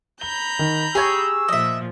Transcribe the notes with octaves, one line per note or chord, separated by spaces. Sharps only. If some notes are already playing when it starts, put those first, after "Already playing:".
A#5 B5 G6 G7
D#3
G4 G#4 C#5 G#5 E6
A#2 F3 D#5 E5